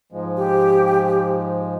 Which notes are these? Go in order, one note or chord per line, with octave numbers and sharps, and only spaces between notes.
G#2 F3 G#3
G4